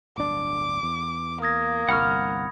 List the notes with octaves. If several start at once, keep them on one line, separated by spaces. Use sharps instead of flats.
D1 G1 D4 D6
E2
A#3 D#6 G#6 A#6
G1 C2 F#5 B5 C#6 F6